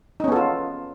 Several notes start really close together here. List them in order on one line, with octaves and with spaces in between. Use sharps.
D#4 C#4 B3 A4 F4